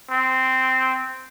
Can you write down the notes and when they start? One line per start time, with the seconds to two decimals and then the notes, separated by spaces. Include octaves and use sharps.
0.10 C4